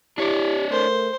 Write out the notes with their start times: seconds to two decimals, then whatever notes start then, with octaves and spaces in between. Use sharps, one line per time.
0.18 D4 E4 G4 C#5 D5
0.71 A3 A#4 C5